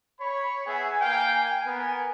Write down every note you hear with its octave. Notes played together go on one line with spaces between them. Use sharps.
C#5 B5
B3 G#4 E5 G#5
A#3 F5 G5
B3 A#4